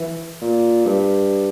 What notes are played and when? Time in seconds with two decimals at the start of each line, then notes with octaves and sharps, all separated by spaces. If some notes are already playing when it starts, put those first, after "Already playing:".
Already playing: E3
0.41 A#2
0.85 G2